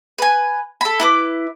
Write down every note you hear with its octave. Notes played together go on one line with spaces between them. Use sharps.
B4 G#5
A4 B5
E4 B4 D6